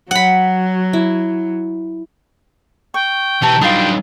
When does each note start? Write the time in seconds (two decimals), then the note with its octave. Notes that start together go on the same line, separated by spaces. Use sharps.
0.11 F#3 F#5 B5
0.93 E4
2.94 G5 C#6
3.42 B2 E3 G4 C#5 A5 A#5
3.61 F#3 G3 D4 D#4 F4 B4 G5 D#6